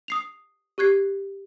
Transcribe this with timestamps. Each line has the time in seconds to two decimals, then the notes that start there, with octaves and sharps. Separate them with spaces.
0.08 D#6 C7 F7
0.78 G4 C#6 F#6 G#6 C7